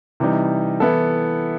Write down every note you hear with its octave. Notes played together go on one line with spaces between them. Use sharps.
C3 E3 G3 D#4
E3 B3 E4 A4